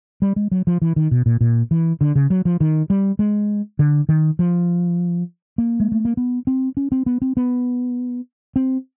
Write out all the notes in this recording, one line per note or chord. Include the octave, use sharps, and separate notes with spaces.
G3
G#3
F#3
F3
E3
D#3
B2
A#2
A#2
E3
D3
C#3
F#3
F3
D#3
G3
G#3
D3
D#3
F3
A#3
G#3
A3
A#3
B3
C4
C#4
C4
B3
C4
B3
C4